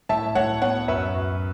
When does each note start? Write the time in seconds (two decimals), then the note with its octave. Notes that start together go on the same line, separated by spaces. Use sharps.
0.09 A2 E5 A5
0.35 A2 C#5 F#5
0.62 B3 C#5 F#5
0.88 F#2 B4 E5
1.14 F#2